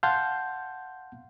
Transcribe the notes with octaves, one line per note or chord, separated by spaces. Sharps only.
F5 F#5 A5 C6 G6